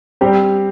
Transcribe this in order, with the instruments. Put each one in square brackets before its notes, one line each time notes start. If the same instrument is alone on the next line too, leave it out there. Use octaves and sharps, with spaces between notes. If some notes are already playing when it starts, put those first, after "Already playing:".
[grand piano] G3 C4 G4